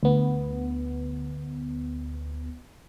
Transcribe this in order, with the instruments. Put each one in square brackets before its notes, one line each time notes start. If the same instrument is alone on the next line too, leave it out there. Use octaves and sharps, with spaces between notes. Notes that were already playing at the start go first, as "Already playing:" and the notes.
[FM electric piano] D2 B3